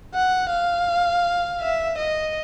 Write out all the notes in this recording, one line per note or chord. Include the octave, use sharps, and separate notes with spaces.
F#5
F5
E5
D#5